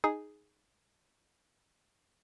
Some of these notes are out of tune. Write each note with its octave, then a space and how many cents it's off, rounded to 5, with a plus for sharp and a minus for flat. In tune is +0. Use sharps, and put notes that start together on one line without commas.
D#4 +0 G#4 +0